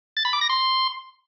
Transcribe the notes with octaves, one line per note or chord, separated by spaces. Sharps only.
A6
B5
D6
A#6
C6